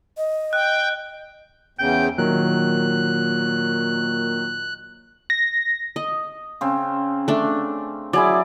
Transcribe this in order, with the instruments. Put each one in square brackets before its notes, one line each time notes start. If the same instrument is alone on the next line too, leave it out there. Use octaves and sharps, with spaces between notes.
[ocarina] D#5
[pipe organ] G5 [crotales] F#6
[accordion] E2 C#3 [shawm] G5
[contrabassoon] A#2 [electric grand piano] D#3 F#3 [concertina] F#6
[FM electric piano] A#6
[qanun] D#5
[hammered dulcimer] C#3 C4
[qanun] A3 D4
[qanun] F#3 [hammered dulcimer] E4 G#4 D5